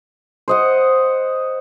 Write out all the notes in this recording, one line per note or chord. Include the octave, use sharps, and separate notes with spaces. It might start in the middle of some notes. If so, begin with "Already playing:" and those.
C5 D#5 F#5